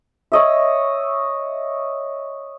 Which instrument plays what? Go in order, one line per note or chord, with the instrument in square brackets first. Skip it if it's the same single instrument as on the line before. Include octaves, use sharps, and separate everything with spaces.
[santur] C#5 D#5 E5